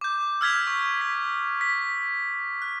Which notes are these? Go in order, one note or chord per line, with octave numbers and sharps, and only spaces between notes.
D6 G6
E6 F6 G#6 B6 F7
C#6
B6
B6
F#6